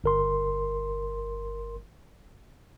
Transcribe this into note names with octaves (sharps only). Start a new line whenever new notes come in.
G1 A#4 C6